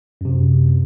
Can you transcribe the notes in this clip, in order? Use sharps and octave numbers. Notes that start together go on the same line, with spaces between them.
F#2 C3